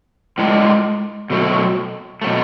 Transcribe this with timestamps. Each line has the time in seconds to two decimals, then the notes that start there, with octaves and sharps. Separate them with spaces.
0.38 A2 G#3 D4 F4
1.30 B2 F#3 A3
2.22 B2 F#3 A3